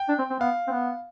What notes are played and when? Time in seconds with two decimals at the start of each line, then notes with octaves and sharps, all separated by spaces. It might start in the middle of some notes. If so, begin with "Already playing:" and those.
Already playing: G5
0.09 D4
0.19 C4
0.30 C4
0.40 B3 F5
0.68 C4
0.71 B3